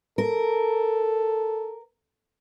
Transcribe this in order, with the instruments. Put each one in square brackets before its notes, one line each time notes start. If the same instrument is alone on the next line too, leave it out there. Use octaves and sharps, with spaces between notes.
[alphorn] A4 [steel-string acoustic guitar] A#4